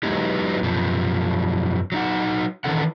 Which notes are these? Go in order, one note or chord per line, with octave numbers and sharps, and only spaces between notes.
F#3 G#3 B3 D#4 E4 G4
F#2 B2 F3
F#3 D#4 F#5
D#3 E3 C#4 A4 F#5